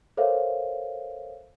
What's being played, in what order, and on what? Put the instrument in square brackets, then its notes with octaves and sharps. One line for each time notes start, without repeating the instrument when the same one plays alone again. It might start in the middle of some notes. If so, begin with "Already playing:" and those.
[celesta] A4 A#4 C5 C#5 E5 F5